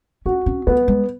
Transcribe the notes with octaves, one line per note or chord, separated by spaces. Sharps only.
C#4 F#4
C#4
A3 B3
G#3